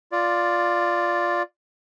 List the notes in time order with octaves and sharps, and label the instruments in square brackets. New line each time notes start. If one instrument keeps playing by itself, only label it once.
[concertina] F4 D5